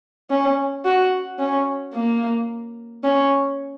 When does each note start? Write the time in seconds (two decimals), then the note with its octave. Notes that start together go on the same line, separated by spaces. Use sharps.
0.30 C#4
0.85 F#4
1.39 C#4
1.94 A#3
3.04 C#4